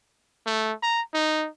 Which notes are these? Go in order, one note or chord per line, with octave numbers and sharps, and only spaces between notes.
A3
A#5
D#4